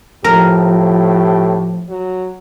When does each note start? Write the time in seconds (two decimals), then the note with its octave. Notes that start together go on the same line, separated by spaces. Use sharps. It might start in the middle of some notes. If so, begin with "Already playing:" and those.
0.24 A2 F3 G4 A#4
1.89 F#3